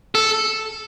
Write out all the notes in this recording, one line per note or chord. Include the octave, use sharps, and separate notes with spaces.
A4